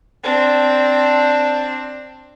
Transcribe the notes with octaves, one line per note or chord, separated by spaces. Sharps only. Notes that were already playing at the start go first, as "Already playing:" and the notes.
C4 D4